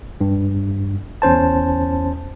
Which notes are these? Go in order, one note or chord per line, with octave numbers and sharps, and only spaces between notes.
G2
E2 C#4 C5 A5